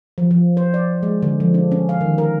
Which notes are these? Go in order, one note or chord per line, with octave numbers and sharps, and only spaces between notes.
F3
F3
C5
D5
G#3
D3
F3
D4
C#4
F5
D#3
A#4